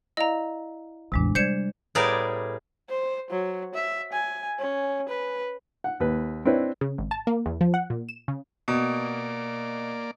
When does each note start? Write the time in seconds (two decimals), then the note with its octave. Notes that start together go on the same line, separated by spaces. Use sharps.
0.17 E4 D5 D#5 F5 A#5
1.12 A1 E2 C3 G#3 D4
1.35 G3 C5 D5 G6 G#6 C#7 E7
1.95 A2 G3 B3 G#4 A#4 D5
2.89 C5
3.30 F#3
3.74 E5
4.12 G#5
4.59 C#4
5.09 B4
5.84 F#5
6.00 D#2 B4
6.45 C4 D4 E4 B4 C#5
6.81 C#3
6.98 G#1
7.11 A5
7.27 A#3
7.46 E2
7.61 F3
7.74 F#5
7.90 A#2
8.09 E7
8.28 C#3
8.68 B2 A#3 D5